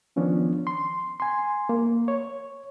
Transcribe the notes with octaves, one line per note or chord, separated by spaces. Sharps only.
D#3 F3 B3 C#4 D4
C6
G#5 C6
A#3
C#5